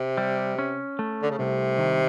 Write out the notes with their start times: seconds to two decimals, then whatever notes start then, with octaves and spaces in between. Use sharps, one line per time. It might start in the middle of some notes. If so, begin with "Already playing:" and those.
Already playing: C3
0.18 G3
0.58 C#4
0.99 A3
1.22 D3
1.30 C#3
1.38 C2 C3
1.78 D#3